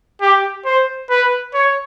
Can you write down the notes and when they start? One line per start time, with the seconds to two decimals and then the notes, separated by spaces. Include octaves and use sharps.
0.21 G4
0.65 C5
1.10 B4
1.54 C#5